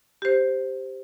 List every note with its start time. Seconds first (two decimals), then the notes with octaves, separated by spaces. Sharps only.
0.22 G4 C5